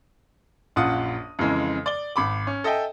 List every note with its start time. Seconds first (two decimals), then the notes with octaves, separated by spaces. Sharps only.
0.76 A#1 F#2 F4 F#5 D#6
1.39 F2 C#3 E3 G#3
1.86 D5 G7
2.16 G#1 B5 D6
2.47 C#4
2.64 A4 D#5 E5 G5 G#5